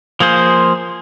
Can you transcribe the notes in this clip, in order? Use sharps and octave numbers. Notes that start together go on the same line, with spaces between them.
F3 A#3 G#4 C5